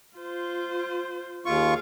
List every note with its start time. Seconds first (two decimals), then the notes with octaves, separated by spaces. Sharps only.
0.17 F4 C5
1.45 D#2 F4 G#4 F5 C#6